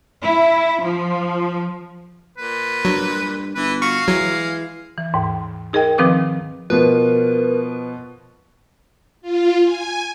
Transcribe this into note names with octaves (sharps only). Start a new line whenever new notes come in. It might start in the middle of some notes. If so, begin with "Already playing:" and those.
E4
F3
A#2 B4
G2 F#3
G1 E3 B4
F#4 F5 C#6
E3 F#3 G#3
E3
D#2 G#2
D#4 G#4 A#4 D#5 G5
D#3 F3 C4 B4 D6 D#6
B2 F3 A#4 B4
F4
G#5